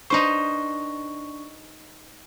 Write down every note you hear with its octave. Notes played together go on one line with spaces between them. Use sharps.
D4 D#4 B4 C5 C#6